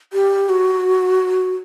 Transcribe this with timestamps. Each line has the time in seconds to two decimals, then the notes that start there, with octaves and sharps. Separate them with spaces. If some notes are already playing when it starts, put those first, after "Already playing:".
0.13 G4
0.49 F#4